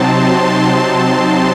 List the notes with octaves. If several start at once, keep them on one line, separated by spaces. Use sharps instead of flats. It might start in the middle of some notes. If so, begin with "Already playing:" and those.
Already playing: C3 F#3 C4 D#4 A5 C6
C6